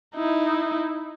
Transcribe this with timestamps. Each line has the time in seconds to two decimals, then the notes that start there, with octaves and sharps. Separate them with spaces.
0.16 D#4 E4